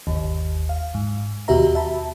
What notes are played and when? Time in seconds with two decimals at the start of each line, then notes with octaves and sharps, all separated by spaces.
0.07 G1 D#2
0.69 F5
0.94 G#2
1.48 D#2 B2 F#4 G4 E5 A#5
1.75 E5 A5 B5